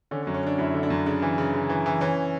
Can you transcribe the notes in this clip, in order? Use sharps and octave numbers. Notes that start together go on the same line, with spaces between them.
D3 C#4
C#4
F#2
C#4
D3 D4
F#2 E4
D3
D4
F#2
C#3 D4
E3
C#3
C#3
E3
E3
E3 C#4